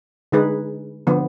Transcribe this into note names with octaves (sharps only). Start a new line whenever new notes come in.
D3 G#3 D#4 G#4 B4
D3 F3 B3